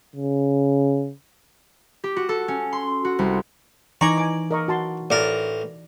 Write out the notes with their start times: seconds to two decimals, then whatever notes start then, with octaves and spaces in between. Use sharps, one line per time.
0.16 C#3
2.04 G4
2.16 F#4
2.29 A4
2.48 C#4
2.73 C6
3.05 F#4
3.19 C2
4.01 E3 D#4 D5 G#5 A#5 C#6
4.18 G#5 D6
4.51 A#4 D#5 C#6
4.68 F#4 A5 C6
5.10 A1 A#4 D5